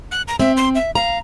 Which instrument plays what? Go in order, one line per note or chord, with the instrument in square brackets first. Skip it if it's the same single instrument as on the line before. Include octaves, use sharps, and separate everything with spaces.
[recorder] F#6
A#5
[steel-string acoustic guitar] C4 [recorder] E5
[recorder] C6
E5
[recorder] F5 [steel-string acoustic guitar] A#5